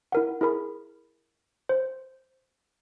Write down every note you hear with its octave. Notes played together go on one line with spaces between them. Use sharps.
E4 A#4 F#5
E4 G#4 A#4 B5
C5